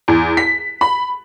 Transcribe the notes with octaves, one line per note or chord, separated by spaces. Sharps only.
E2
B6
B5